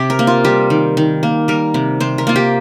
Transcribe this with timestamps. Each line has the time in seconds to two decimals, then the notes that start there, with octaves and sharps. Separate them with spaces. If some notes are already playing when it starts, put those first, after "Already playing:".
Already playing: C3 G4
0.10 A#4
0.19 A#3
0.27 F4
0.45 G3 G4
0.70 D#3
0.97 D#3
1.23 A#3
1.48 G3 A#4
1.74 C3
2.00 C3 C5
2.18 A#4
2.27 A#3 F4
2.36 G4